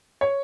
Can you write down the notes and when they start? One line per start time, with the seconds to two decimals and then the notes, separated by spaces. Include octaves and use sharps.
0.21 C#5